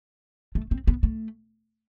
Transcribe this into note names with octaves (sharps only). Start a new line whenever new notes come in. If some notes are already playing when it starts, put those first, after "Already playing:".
A3
C4
B3
A3